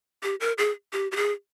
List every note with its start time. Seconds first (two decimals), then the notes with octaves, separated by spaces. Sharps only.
0.23 G4
0.40 A#4
0.58 G#4
0.93 G4
1.12 G4
1.16 G#4